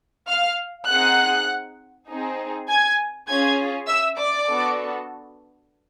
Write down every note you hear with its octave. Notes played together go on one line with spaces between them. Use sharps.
F5 F6
C4 D#4 G#4 F#5 F#6
C4 D#4 G#4
G#5 G#6
C#4 F4 G#4 G#5 G#6
E5 E6
D5 D6
B3 D4 F#4 A4